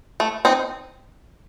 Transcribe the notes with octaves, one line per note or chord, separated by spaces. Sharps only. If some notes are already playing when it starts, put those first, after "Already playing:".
A3
C4 D#4